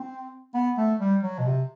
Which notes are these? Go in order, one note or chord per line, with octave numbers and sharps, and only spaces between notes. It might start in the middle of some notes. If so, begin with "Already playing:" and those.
Already playing: C4
B3
A3
G3
F#3
B2
C3